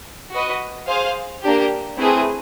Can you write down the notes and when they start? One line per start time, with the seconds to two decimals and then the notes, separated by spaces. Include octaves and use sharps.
0.32 F#4 B4 D#5
0.87 G#4 C5 F5
1.43 A#3 D4 G4
1.98 A3 C4 E4 G#4 B4